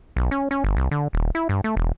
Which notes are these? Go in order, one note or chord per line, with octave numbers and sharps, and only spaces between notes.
B1
C#4
C#4
G1
C2
D3
D#1
E4
G2
A3
E1